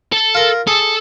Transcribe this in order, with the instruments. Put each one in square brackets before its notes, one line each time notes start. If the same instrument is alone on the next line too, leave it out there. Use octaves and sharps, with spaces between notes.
[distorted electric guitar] A4
[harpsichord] F4 A#4
[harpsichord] G#4 [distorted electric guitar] A4